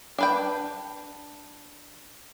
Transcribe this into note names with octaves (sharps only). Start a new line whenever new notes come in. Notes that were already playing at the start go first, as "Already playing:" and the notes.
D4 B4 G5